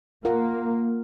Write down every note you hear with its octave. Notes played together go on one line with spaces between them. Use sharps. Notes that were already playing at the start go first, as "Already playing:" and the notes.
A#3 F4 A#4 F#5